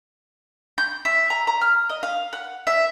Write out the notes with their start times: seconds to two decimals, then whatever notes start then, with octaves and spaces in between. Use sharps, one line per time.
0.78 G6
1.05 E5
1.30 A#5
1.47 A#5
1.61 F6
1.89 D#5
2.03 F5
2.33 F#5
2.67 E5